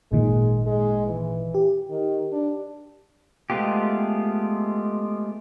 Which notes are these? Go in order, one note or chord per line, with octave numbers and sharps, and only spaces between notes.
G#1 A#2 D#3 G#3
G#3
E3
G4
D#3
D4
G#3 A3 B3 F4 G4